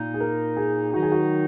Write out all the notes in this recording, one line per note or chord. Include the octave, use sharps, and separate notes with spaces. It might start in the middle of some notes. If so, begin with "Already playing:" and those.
Already playing: A#2 A#3 D#4
G#4
A#4
G#4
D#3 F#3 D#4 F#4
G#4
F#4